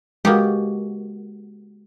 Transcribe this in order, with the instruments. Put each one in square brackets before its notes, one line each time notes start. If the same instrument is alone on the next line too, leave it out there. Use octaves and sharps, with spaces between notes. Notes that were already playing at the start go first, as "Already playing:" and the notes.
[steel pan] G#3 F#4 [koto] A#3 B3 G4